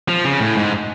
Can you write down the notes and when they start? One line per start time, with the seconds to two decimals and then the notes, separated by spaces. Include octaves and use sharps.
0.09 F3
0.25 C#3
0.40 A2
0.57 G#2